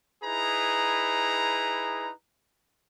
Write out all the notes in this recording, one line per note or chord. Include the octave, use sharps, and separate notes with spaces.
D#4 E4 G#4 B4 A#5